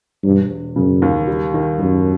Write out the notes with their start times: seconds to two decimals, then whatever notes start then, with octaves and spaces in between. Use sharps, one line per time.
0.24 E1 G2
0.50 E1
0.76 F#2 C#3
1.02 D#2
1.27 G3
1.54 D#3
1.79 F#2 D#3